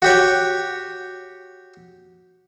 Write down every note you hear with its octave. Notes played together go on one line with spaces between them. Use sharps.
F#4 G4 C#5